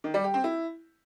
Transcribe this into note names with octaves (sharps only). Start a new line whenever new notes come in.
D#3
G3
G4
C4
E4